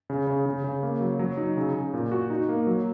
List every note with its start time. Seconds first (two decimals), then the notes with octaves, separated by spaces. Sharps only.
0.10 C#3
0.27 C#3
0.46 C#3
0.64 C#3
0.83 A#3
1.01 F#3
1.19 F#3
1.37 D#4
1.57 C#3
1.75 C#3
1.94 A#2
2.12 F#4
2.30 D#4
2.49 A#3
2.67 F#3